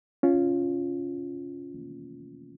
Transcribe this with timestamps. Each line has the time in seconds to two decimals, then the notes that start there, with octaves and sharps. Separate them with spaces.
0.23 C#4 F4